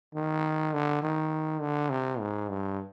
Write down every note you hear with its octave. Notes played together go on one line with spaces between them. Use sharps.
D#3
D3
D#3
D3
C3
G#2
G2